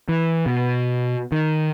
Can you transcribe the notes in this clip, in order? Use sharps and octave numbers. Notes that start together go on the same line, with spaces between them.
E3
B2
D#3